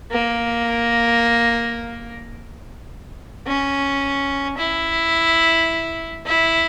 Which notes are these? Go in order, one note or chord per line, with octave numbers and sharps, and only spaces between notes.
A#3
C#4
E4
E4